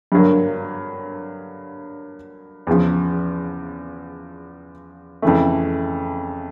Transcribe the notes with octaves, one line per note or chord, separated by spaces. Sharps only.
G2 D3 F#3 A#3
E2 C#3 F3
F2 C#3 E3 A3